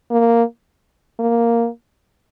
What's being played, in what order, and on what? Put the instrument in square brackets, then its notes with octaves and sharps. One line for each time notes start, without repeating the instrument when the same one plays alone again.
[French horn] A#3
A#3